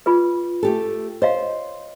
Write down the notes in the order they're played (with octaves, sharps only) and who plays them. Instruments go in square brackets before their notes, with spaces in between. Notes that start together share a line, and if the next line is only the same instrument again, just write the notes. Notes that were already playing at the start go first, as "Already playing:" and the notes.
[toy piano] F4 G#4 B4
[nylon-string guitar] A3 G4 A4
[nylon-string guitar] C5 [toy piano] C#5 D#5 F5